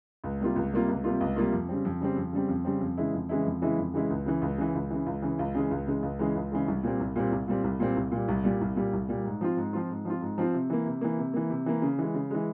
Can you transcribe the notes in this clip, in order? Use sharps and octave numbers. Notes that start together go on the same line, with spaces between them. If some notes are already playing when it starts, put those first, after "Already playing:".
C#2
C3 G3 A#3 F4
C#2
C3 G3 A#3 F4
C#2
C3 G3 A#3 F4
C#2
C3 G3 A#3 F4
F2
C#3 G3 C4
F2
C#3 G3 C4
F2
C#3 G3 C4
F2
C#3 G3 C4
F2
C#3 E3 G#3 E4
F2
C#3 E3 G#3 E4
F2
C#3 E3 G#3 E4
F2
C#3 E3 G#3 E4
C#2
C#3 E3
C#2
C#3 E3
C#2
C#3 E3
C#2
C#3 E3
C#2
C#3 E3 G#3
C#2
C#3 E3 G#3
C#2
C#3 E3 G#3
C#2
C#3 E3 G#3
C2
A#2 G3 C4
C2
A#2 G3 C4
C2
A#2 G3 C4
C2
A#2 G3 C4
C2
A#2 G3
C2
A#2 G3
C2
A#2 G3
C2
A#2 G3
G#2
F3 C4 F4
G#2
F3 C4 F4
G#2
F3 C4 F4
G#2
F3 C4 F4
C3
E3 A#3
C3
E3 A#3
C3
E3 A#3
C3
E3 A#3
C#3
E3 G#3
C#3
E3 G#3